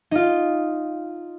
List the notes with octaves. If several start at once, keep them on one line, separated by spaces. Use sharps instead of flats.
D#4 F4